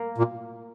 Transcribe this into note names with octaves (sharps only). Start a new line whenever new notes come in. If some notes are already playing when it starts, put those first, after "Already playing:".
Already playing: A#3
A#2